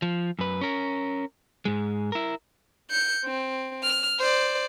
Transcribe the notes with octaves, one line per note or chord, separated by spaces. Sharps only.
F3
F#2 B4
C#4 A#4
G#2 G#3
E4 A#4
G6 C#7
C4
F6
C5 D5